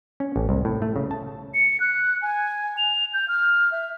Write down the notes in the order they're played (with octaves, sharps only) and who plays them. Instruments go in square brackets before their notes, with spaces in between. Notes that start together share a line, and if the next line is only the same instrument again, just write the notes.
[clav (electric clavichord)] C#4
A1
C2
A2
A3
C#3
A5
[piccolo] C#7
F#6
G#5
F7
G6
F6
E5